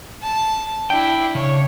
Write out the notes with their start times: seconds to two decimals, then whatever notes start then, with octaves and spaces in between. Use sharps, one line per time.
0.23 A5
0.90 D4 E4 G5
1.35 C#3 C#5